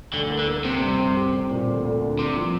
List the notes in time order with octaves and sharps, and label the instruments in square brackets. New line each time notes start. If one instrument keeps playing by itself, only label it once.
[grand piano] D2 [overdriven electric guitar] D3
[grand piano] A#3
[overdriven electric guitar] D3
[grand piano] A#3
[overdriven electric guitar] C3 [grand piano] C4
[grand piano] G2
C4
G4
C4
A#2
D2
D2
D4
[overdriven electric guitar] C3 [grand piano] A#3
[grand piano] F3